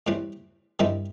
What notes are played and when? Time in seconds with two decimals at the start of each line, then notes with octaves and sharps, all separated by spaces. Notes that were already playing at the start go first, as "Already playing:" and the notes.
0.07 A2 E3 G3 C4
0.79 G2 D#3 G3 C4 E4